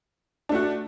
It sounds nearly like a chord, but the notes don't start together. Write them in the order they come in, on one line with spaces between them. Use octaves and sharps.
D4 A3 F#4